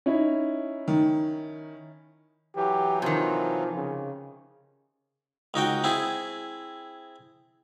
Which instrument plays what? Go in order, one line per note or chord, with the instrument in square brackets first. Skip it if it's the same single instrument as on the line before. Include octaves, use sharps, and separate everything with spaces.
[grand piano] C#4 D#4 E4
[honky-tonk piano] D#3
[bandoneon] E3 F#3 [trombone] G4
[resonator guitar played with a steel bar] C3 D#3 [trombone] F3
[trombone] C#3
[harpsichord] C#2 D#4 F#4 G5
C4 E4 G#4